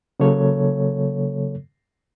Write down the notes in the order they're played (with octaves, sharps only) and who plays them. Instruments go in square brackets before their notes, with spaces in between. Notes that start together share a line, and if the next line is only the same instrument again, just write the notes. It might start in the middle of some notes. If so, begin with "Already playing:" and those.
[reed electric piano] C#3 F#3 A#3 A4 C#5